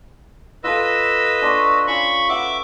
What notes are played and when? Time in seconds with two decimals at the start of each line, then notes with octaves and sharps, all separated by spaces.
0.64 F4 A4 B4 D#5 E6
1.42 D4 C6 C#6
1.87 C#4 F4 B5 C#6
2.29 B4 E5 F#5 D6